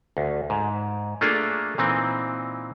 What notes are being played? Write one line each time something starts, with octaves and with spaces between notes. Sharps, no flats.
D2
G#2
A3 A#3 D4 F4 G#4 A4
A#2 E3 C4 D#4